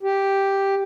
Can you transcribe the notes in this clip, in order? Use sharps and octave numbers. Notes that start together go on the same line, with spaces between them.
G4